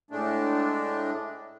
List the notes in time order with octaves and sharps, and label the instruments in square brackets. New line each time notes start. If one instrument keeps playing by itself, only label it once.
[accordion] A2 G#3 A3 D4